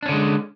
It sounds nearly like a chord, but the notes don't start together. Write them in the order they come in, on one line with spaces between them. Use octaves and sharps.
D4 C#4 D3 G#3